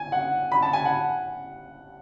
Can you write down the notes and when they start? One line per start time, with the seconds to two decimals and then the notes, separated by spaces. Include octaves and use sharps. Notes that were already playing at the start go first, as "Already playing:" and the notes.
Already playing: G#5
0.12 F#5
0.52 B5
0.62 A5
0.73 G#5
0.85 F#5